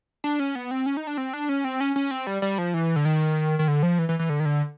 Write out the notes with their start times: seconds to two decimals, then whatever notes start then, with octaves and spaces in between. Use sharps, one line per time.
0.24 D4
0.40 C#4
0.55 B3
0.71 C4
0.86 C#4
0.97 D#4
1.07 D4
1.18 C4
1.33 D4
1.49 C#4
1.64 C4
1.80 C#4
1.96 C#4
2.11 C4
2.27 G3
2.42 G3
2.58 F3
2.74 E3
2.96 D3
3.05 D#3
3.59 D#3
3.68 D3
3.83 F3
3.99 E3
4.09 E3
4.19 E3
4.29 D3
4.40 D#3
4.45 D3